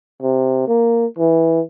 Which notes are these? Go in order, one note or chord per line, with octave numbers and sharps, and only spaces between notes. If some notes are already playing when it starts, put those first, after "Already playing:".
C3
A#3
E3